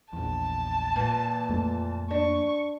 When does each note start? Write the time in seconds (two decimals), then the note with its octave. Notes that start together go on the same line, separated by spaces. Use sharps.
0.13 A#1 E2 A5
0.96 A#2 E3
1.49 F2 A3 A#3
2.11 D4 C#6